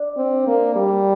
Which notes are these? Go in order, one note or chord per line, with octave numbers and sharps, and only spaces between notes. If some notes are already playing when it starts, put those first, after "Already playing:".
Already playing: D4
C4
A#3
G3